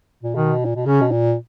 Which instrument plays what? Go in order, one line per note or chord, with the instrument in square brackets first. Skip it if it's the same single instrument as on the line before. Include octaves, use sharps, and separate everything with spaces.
[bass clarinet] A#2
[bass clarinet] B2 [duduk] D#3
[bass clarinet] A#2
B2
[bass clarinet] C#3 [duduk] C#4
[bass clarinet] B2
A#2